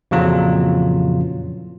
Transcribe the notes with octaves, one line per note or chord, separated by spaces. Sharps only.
F2 A#2 C#3 E3 F#3 F4